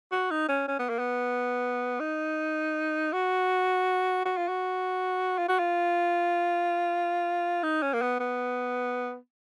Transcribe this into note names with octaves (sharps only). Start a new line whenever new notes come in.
F#4
D#4
C#4
C#4
B3
A#3
B3
D#4
F#4
F#4
F4
F#4
F4
F#4
F4
D#4
C#4
A#3
B3
B3